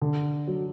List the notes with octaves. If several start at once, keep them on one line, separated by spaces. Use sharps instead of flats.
D3
F#3